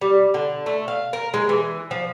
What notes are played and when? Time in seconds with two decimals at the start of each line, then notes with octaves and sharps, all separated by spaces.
0.01 G3
0.34 D3
0.66 A3
0.88 F5
1.13 A#4
1.34 G#3
1.49 E3
1.91 F3